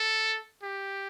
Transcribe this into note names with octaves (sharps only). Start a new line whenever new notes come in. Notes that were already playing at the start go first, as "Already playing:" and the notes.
Already playing: A4
G4